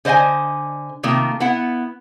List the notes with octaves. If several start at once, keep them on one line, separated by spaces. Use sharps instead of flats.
D3 C5 D#5 F5 G#5
C3 D#3 A3 A#3 F4
B3 E4 F#5